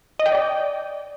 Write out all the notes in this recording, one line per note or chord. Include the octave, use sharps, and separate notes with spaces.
D#5
G5
D5